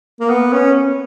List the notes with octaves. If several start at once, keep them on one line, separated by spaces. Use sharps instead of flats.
A#3
B3
C#4